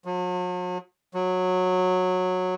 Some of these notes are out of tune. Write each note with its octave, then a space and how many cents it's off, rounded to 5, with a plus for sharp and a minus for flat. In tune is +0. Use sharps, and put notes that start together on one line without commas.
F#3 -45
F#3 -15